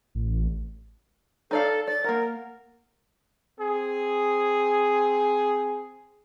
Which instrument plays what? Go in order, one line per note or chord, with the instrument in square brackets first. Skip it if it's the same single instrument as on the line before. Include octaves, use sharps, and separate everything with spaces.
[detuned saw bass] A1
[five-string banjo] D#4 D5 F5 [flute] A4
[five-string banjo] D5 [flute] A6
[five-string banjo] A#3 F#5 [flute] A#4
[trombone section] C4 G#4